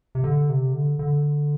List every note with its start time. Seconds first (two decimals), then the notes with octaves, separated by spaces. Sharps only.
0.15 C3
0.24 D3
0.49 C3
0.73 D3
0.99 D3